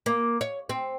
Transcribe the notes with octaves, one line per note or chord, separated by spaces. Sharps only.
A#3
C#5
C4